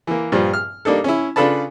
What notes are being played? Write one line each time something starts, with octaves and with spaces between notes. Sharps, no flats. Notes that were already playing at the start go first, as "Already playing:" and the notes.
E3 A#3
G2 A#2 F3 G3
F6
G3 A#3 D4 D#4 A4
C#4 E4
C#3 D4 F4 A4 B4 A5